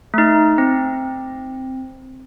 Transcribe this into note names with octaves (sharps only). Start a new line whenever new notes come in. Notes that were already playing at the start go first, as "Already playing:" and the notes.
A3 D#4
C4